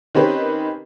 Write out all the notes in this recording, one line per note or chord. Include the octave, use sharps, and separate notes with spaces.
D#3 C4 C#4 G4 B4